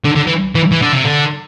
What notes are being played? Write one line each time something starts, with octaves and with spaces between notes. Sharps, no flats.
D3
D3
E3
E3
E3
D3
C3
D3